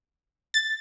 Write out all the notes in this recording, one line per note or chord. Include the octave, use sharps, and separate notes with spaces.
A6